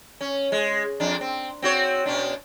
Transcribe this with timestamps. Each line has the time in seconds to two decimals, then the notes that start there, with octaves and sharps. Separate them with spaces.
0.21 C#4
0.52 G#3
1.00 F2 D4
1.21 C4
1.62 C4 F#4 C#5
2.06 B2 C#4 D4